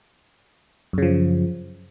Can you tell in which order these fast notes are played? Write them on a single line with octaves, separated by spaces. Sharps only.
F#2 C#3 F3